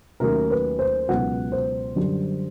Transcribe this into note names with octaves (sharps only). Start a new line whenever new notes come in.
D#2 D#3 F#3 A3 C#4 A#4
B4
C5
C#2 B2 F#3 B3 F#5
C5
F#2 D3 G3